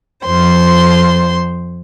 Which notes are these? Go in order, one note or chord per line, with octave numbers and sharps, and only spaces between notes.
F2 C5 C6